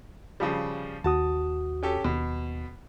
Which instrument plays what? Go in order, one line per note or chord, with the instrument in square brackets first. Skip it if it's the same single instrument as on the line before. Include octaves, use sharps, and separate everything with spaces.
[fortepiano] C#3 F3 G3
[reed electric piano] D#2 F#4 D#6 [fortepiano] A5
[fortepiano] C#4 G4 A4
[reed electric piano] D#2 [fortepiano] B2